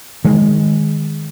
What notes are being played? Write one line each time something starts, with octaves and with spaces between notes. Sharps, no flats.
D#3 G#3